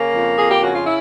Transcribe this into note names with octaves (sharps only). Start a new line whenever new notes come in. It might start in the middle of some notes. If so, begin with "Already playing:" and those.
Already playing: C#3 A#3
F2
F2 G#4
G4
C#3 F#4
F4
E4